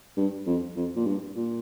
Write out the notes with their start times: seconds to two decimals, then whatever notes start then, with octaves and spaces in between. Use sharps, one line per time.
0.17 G2
0.47 F2
0.76 F2
0.96 A#2
1.07 G2
1.37 A#2